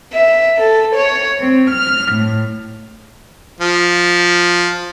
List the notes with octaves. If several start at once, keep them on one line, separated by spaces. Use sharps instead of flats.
E5
A4
C#5
C4
F6
A2
F3